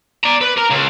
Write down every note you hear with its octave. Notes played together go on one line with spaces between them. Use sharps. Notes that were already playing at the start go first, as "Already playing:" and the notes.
D5 A#5
B4
A#4 A#5
C#2